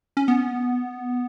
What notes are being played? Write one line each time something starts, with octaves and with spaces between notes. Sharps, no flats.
C#4
B3